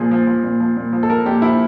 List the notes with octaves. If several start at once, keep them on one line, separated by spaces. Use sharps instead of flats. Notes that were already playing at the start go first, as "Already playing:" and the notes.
Already playing: A#2 F3 G#4
F3
F3
A#2
F3
A#2
F3
A4
F3 A#4
A#2 G4
F3 E4